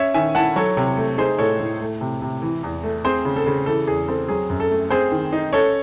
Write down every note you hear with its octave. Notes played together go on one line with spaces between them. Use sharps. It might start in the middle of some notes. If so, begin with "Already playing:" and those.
Already playing: C#4 C#5 E5
D#3 E5 G#5
E4 F#5 A5
F#3 A4 C#5
C3
A3
D#4 G#4 C5
A2 A4 C#5
A2
A3
C3
C3
E3
E2
A3
C4 G#4 C5
C#3
A4
C#3
E3 A4
E2 G#4
C4 A4
F#3 G#4
F#2
A4
A3
C4 G#4 C5
D#3
D#4
C#4 A4 C#5